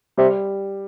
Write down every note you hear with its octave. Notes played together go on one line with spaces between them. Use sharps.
C3 G3